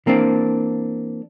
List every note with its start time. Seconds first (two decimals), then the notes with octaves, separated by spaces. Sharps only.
0.06 E3 A#3 C4 D4